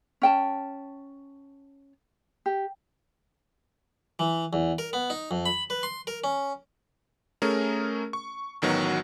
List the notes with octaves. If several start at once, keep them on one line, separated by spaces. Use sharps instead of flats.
C#4 G5 A5
G4
E3
E2
A#4
B3
D#4
F2
B5
B4
C6
A#4
C#4
A3 C#4 G#4 A#4
C#6
A1 D#3 F#3 B3 F#4 F#5